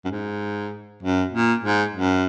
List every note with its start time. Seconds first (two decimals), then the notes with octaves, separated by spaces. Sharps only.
0.05 F#2
0.11 G#2
1.03 F#2
1.32 A#2
1.63 G#2
1.94 F#2